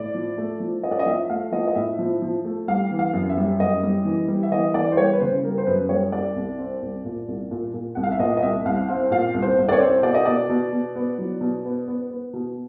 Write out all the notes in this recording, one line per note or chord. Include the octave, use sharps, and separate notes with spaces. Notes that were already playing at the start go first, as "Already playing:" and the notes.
Already playing: A2 D5
F3
A3
F3
C#4 D#5
D5
D#5
F3 E5
A3 F5
F3 D#5
D#5
A2 E5
F3
F3
A3
G3 F5
E3
F5
F#2
E5
G3
F#2 D#5
G3
E3
G3
E5
E3 D#5
E3 D5
C5
G3 C#5
B4
C#3 C5
G3 A#4
C5
F#2 B4
G3 C#5
G3 D5
C2
C4
C2
A#2
C2
A#2
A#2
C2 F#5
F5
E5
A#2 D#5
D#5
C2 E5
C2 F5
C4 F5
A#2 F5
C2
C5
C2
D5
C#5
C4
B2 D5
D#5
B2 D5
B2
B2
B3
F#3
B2
B3
B3
B3
B2